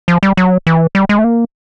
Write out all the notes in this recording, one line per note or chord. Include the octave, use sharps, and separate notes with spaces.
F3
G3
F#3
E3
G3
G#3
A3
A#3